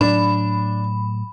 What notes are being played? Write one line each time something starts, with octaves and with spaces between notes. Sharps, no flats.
A2 F#3 D4 B5